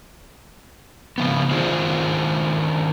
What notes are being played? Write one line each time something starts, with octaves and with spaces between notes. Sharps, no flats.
C#3 F3 B3
D#3 D4 F4 G#4 C5